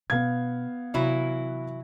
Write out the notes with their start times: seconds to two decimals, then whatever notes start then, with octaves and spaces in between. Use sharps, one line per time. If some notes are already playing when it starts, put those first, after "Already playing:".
0.10 B2 B3 D4 F5 G#6
0.94 C3 E3 F#3 E4